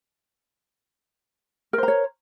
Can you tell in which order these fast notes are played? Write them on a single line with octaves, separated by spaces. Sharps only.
A#4 C5 A#5 C#5